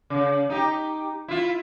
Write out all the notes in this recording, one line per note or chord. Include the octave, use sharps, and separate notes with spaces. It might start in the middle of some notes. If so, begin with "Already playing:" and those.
C#3
D#4 G4
E4 F4